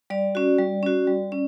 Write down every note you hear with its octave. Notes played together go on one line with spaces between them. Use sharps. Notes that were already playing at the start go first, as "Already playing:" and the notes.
G3 D5
C#4 F#4
G3
C#4 F#4
G3
C#4